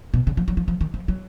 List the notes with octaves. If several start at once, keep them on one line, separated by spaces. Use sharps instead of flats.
B2
C#3
F3
F#3
F3
F3
D#3
F3
F#3